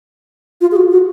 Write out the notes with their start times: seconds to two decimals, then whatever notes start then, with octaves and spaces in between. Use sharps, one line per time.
0.61 F4
0.72 G#4
0.76 F#4
0.91 F#4